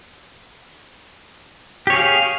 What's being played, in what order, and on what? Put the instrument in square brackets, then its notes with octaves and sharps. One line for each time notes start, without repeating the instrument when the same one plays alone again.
[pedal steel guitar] G4
C#5
G#4
F5